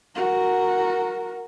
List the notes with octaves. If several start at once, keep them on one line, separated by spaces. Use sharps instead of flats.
F#4 A#4